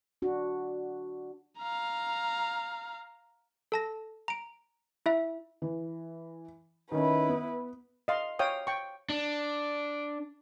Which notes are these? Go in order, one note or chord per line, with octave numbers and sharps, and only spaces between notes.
D4 F#4
F5 A#5
A4 A5 A#6
A#5 D7
E4 E5
E3
D#3 C#4 E4 B4
B3
D#5 F5 C6
C#5 F5 G5 D#6
G5 C#6
D4